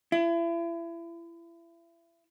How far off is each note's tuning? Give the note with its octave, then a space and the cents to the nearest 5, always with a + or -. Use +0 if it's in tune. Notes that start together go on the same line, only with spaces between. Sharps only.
E4 +35